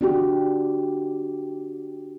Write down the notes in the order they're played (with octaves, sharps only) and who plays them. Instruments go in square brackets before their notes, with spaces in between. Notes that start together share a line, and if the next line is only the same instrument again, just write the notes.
[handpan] D4 F#4 G4